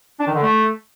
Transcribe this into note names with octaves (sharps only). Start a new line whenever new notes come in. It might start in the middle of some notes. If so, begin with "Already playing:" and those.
D4
D#3
D3
A3